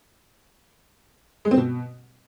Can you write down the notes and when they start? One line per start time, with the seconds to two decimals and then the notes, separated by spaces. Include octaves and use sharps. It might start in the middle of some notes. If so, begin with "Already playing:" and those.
1.45 G#3
1.51 C4
1.57 B2